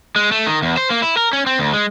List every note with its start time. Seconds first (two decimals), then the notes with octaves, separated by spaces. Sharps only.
0.16 G#3
0.32 A3
0.47 D#3
0.62 E2
0.77 C5
0.90 A#3
1.02 E4
1.17 A#4
1.33 C#4
1.46 C4
1.59 D2
1.73 G#3